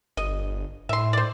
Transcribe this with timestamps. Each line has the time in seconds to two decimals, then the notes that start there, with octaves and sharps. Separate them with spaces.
0.17 G1 D#5
0.89 A2 E5 C6
1.13 C5 D5